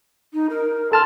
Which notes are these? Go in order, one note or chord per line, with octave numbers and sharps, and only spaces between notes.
D#4
A#4
A4 A5 C6 F6